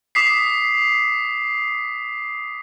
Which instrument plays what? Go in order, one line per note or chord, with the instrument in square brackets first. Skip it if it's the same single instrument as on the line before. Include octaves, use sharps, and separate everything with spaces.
[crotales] D6 D#6 B6 C7